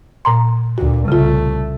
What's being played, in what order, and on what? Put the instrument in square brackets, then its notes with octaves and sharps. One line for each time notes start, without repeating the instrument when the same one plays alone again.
[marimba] A#2 A#5 C6
[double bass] D2 A#2 [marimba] F#4
[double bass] C2 A3 [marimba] C#3 F4